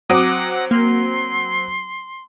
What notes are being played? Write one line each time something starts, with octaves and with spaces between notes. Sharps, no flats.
F#3 C4 F#5 D6 D#6
A#3 C6